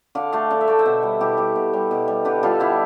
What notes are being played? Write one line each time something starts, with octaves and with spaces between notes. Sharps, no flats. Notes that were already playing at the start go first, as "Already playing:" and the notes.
D3 D5 F5
A3 D5 F5
D3 F5
E5
A3 D5
C5 E5
B2
G3
B2 E4 G4
G3 E4 G4
B2
G3
B2
G3
D3 G4 B4
G3 F4 A4
D3 E4 G4